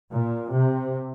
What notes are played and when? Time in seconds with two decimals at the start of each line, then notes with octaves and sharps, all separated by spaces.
0.13 A#2
0.54 C3